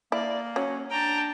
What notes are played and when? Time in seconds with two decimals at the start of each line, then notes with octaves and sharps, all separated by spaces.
0.12 A#3 E4 D5
0.56 F#3 C#4
0.91 D4 G5 A5 A#5